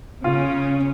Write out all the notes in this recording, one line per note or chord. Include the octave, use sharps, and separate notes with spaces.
C#3 C#4 F4